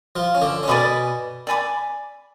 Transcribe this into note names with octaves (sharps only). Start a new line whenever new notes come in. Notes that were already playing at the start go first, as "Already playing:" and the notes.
F3 F4
C#4
D3 D4
C#4
B2 B3 D5 G#5 B5 D6
D5 G#5 B5 D6